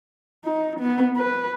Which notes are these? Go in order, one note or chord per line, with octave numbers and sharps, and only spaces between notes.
D#4
B3
B4